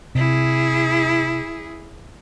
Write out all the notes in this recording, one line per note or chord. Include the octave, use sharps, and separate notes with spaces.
C3 E4 G#4